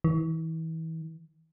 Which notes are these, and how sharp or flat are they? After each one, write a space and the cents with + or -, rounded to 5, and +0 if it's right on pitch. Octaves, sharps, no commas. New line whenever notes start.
E3 -35